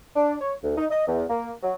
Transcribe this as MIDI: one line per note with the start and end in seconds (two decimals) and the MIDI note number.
0.16 0.35 62
0.41 0.55 73
0.64 0.76 38
0.77 0.85 63
0.91 1.04 75
1.08 1.25 40
1.30 1.52 58
1.63 1.75 54